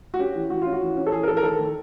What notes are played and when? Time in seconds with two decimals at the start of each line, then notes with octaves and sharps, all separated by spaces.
0.14 F#4
0.19 C#4 G4
0.35 E3
0.50 E3 F#4
0.62 C#4 F4
0.73 F#4
0.82 E3
0.96 C#4
1.07 A4
1.12 E3 G#4
1.23 A#4
1.28 E3 A4
1.37 A#4
1.43 D#3 A4
1.59 D#3